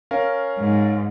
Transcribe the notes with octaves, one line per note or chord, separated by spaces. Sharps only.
C#4 A#4 F5
G#2